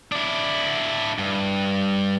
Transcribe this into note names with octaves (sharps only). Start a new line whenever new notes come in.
D4 E4
G2